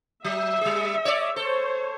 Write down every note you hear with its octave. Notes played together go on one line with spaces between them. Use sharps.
F#3 E5
G3 G#4
C#5 D5
A4 C5 C#5